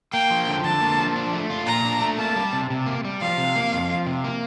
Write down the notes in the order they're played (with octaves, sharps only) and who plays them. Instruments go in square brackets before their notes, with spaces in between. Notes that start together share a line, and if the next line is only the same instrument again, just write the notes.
[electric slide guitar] A#3 [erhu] G5
[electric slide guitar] F3
D3
[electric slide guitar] D3 [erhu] A5
[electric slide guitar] A#3
F3
D4
A3
F4
[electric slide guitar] A#2 [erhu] A#5
[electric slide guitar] D4
A3
[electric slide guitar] A#3 [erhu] A5
[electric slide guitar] G3
C3
C3
A#3
G3
[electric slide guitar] F3 [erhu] F5
[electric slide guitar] C3
A#3
F2
F3
C3
A#3